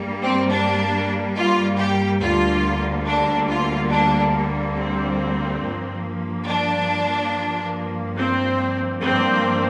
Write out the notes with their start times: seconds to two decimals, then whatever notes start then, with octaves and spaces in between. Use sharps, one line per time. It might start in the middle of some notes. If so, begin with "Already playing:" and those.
Already playing: G2 G3 A#3
0.22 C4
0.51 D4
1.36 F4
1.78 G4
2.20 D2 D3 G3 A#3 F4
3.06 D4
3.49 F4
3.91 D4
4.77 C4
5.62 G2 F3 A#3
6.47 D4
8.18 C4
9.03 G2 F3 A#3 C4